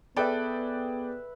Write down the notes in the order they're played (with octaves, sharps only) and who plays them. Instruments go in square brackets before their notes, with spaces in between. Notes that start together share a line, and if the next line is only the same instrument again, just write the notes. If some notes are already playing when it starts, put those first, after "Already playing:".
[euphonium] B3 [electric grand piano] G#4 D5 G5 [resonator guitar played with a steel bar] A4 [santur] B4 E5